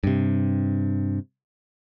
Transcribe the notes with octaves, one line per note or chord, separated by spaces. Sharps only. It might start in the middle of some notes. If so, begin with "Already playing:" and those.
G2 C3